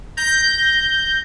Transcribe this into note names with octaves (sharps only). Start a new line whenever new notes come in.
G6 A#6